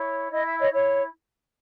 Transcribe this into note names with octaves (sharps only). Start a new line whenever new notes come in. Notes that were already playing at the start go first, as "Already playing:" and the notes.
Already playing: E4 C#5
E4 D#5
E5
C#5 D#5
E4 C#5